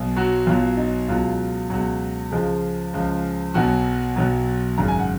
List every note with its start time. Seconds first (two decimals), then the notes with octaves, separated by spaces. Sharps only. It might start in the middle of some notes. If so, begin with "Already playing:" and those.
Already playing: B1 B2
0.16 F#3 F#4
0.46 B1 B2 F#3 F4
0.77 D#4
1.08 C#2 B2 F#3 F4
1.70 C#2 B2 F#3 F#4
2.31 C#2 C#3 F3 G#3 G#4
2.94 C#2 C#3 F3
3.54 B1 B2 F#3 F#4 F#5
4.16 B1 B2 F#3
4.78 G#1 F#2 C#3 A#5
4.88 G#5
4.99 F#5